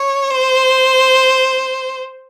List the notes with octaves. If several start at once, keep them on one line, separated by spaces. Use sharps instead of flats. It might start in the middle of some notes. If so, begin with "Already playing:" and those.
Already playing: C#5
C5